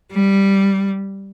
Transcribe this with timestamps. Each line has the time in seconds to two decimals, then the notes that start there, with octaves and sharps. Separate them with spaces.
0.12 G3